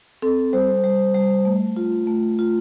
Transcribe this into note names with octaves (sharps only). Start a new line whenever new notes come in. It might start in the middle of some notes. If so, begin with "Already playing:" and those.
C4 A4
G3 C5
G3
G3
A3
F4
A3
F4